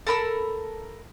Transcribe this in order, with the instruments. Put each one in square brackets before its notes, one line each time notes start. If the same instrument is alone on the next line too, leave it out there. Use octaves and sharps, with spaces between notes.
[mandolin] A4 A#4 B5 E6